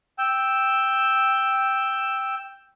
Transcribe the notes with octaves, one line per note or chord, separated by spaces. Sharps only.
G5 E6